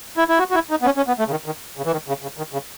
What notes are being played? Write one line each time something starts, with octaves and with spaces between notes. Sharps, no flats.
E4
E4
F#4
F#4
E4
D#4
B3
C#4
C#4
B3
A3
C#3
D#3
D#3
C#3
E3
D#3
C#3
C#3
D#3
C#3